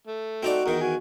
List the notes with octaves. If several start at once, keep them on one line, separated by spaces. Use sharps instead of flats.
A3
C4 D#4 F#4 D5
E2 D#3 D#4 A#4
F#4 G#5